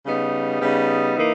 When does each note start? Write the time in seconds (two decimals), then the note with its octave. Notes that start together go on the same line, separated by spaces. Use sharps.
0.05 C#3 G3 B3 D#4
0.61 C#3 G3 B3 D#4
1.18 E3 A#3 D#4